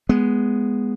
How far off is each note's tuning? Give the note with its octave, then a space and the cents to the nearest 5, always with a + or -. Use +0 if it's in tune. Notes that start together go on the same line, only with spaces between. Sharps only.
G#3 +0 B3 +0